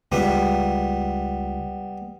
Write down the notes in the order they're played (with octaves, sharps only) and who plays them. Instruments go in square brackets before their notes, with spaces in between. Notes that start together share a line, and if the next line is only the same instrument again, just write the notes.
[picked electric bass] C#2 [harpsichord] G3 B3